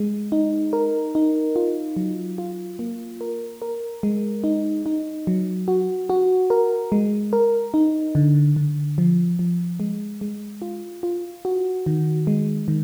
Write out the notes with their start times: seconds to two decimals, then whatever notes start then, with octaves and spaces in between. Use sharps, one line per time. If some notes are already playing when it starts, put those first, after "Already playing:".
Already playing: G#3
0.32 D#4
0.73 A#4
1.15 D#4
1.56 F4
1.96 F#3
2.38 F4
2.79 A#3
3.21 A#4
3.62 A#4
4.03 G#3
4.44 D#4
4.86 D#4
5.27 F#3
5.68 F#4
6.10 F#4
6.50 A#4
6.92 G#3
7.33 A#4
7.74 D#4
8.15 D3
8.56 D3
8.98 F3
9.39 F3
9.80 G#3
10.21 G#3
10.62 F4
11.03 F4
11.45 F#4
11.86 D#3
12.27 G#3
12.68 D#3